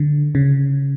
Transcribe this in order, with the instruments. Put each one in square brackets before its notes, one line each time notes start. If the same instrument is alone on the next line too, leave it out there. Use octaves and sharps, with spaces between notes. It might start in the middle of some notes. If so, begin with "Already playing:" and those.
Already playing: [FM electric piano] D3
C#3